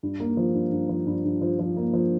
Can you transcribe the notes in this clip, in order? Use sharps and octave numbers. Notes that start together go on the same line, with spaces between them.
G2
A#3
F3
G2
G2
F3
G2
G2
F3
F3
A#3
F3